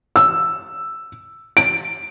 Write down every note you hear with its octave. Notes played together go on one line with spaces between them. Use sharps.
E6
D7